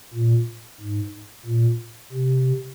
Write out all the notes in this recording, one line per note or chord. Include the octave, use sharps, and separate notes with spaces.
A#2
G#2
A#2
C3